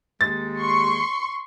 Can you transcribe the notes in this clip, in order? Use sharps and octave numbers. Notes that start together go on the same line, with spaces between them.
D#2 G#3 A6
C6 C#6